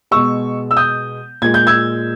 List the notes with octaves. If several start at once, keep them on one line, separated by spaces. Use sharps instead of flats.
B2 G#3 C#6 E6
E6
D#6 G6
A#2 G#3 G#6
G6
E6 G#6